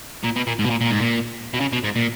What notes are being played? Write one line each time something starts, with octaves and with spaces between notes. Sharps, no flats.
A#2
B2
A#2
G#2
B2
A#2
A#2
G#2
A#2
B2
C#3
B2
G#2
A#2